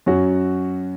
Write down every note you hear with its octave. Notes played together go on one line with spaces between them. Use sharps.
F#2 F#3 C#4 F#4